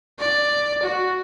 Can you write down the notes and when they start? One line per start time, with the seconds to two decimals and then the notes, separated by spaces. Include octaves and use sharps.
0.19 D5
0.83 F#4